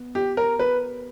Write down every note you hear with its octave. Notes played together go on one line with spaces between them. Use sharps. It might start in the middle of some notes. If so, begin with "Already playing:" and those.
Already playing: B3
G4
A#4
B4